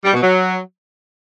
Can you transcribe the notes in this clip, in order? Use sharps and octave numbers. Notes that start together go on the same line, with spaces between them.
G3
B2
F#3